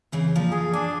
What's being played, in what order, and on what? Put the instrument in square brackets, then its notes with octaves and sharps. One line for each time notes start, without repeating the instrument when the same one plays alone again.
[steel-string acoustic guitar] C#3 E3 C4
A#2 F3
[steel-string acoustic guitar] F4 [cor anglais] G#4
[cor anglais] D4 [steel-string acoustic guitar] G#5